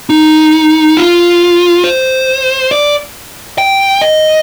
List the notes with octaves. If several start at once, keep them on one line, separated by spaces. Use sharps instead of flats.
D#4
F4
C5
D5
G5
D#5